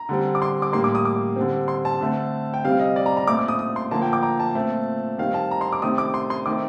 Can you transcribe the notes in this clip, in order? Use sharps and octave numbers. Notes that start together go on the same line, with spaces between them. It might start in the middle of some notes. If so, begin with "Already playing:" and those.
Already playing: A#5
D3 G3 C4
D6
C6
D6
A2 G3 A#3 C6
D6
D#6
D6
D3 G3 C4
C6
A5
D3 A3 C4
G5
C3 G3 C4 F5
D#5
D5
A#5
A#5
A#2 A3 C4 D6
D6
D#6
D#6
C6
D3 F3 A#3 A5
G5
D6
A#5
A5
A#2 A3 C4
D#3 G3 C4 F5
A5
A#5
C6
D6
C3 D#3 A3 C4 D#6
D6
C6
C6
D#3 A3 C4 D6